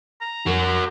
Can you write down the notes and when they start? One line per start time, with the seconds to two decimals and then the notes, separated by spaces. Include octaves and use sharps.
0.21 A#5
0.46 F2 F#4 A#4